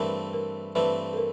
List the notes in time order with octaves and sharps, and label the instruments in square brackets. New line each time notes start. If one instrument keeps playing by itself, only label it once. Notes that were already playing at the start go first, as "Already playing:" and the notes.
Already playing: [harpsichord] G2 E3 A3 C4 [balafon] A#4
[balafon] A#4
[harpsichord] G2 E3 A3 C4 [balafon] B4
[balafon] A4
A#4